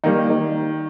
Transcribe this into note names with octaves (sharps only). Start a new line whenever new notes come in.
D#3 G3 A#3 D#4